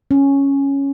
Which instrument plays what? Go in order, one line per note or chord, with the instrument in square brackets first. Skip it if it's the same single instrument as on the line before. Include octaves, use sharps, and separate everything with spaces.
[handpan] C#4